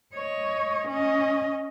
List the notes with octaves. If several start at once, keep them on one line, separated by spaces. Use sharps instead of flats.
C#5 D#5
C#4 D#5